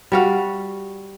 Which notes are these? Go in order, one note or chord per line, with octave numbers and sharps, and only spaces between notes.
G3 F#4 F5